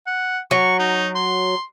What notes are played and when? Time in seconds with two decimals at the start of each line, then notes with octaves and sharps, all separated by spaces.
0.07 F#5
0.51 F#3 C#6
0.79 D#4
1.15 C6